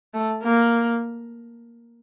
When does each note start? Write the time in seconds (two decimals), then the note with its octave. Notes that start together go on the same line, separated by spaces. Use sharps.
0.14 A3
0.43 A#3